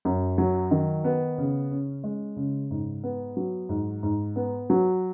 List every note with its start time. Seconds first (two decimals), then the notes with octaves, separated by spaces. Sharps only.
0.05 F#2
0.38 F#3
0.71 D#3
1.04 B3
1.38 C#3
1.71 C#4
2.04 G#3
2.36 C#3
2.71 G#2
3.04 B3
3.37 F#3
3.69 G#2
4.03 G#2
4.36 B3
4.70 F#3